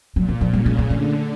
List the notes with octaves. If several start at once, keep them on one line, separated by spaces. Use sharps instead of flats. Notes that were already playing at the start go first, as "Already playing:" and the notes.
A#2 F#3
E3
F3
C#3 G3
G#3
A3
D3 A3